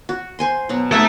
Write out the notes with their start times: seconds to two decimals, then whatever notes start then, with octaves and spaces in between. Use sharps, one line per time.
0.09 F#4
0.39 C5 G#5 C6
0.69 B2 F#3 F#4
0.91 C4 D#4 F#4 A4 E5